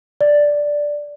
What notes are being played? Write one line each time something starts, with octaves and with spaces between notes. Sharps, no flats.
D5